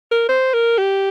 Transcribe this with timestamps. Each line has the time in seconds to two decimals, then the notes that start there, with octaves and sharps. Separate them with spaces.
0.11 A#4
0.29 C5
0.54 A#4
0.78 G4